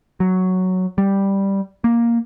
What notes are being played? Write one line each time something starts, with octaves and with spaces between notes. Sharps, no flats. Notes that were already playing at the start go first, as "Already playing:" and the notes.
F#3
G3
A#3